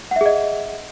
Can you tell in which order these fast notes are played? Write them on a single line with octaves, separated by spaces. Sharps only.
F#5 E5 G#4 D#5